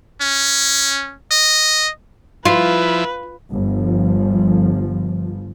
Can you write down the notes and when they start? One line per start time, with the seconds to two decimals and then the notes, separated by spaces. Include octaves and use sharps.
0.21 C#4
1.31 D#5
2.45 F3 E4 F4 B4
3.53 G1 F3